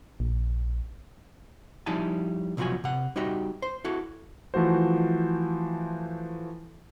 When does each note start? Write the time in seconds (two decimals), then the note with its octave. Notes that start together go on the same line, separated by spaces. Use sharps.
0.20 A#1
1.86 F3 G3 D#4 E4 G#5 A5
2.57 C2 B2 F3 F#3 F#4 G#5
2.84 C3 F#5
3.16 G3 D#4 F#4 G4 D#5 E5
3.62 C5
3.85 E4 F#4 A4
4.54 E3 F3 A3 F#4 C5